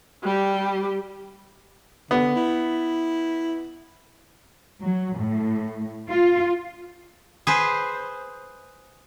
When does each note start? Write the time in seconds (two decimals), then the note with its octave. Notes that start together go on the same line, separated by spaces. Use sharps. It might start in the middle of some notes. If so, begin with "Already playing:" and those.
0.24 G3 G4
2.11 D3 B3
2.36 E4
4.82 F#3
5.18 A2
6.10 F4
7.47 G#4 B4 C5